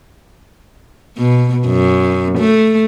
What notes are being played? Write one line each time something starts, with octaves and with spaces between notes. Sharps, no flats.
B2
F#2
A3